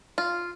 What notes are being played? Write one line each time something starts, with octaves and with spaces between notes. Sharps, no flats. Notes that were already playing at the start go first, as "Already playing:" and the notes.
F4